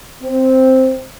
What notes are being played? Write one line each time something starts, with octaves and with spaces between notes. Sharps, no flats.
C4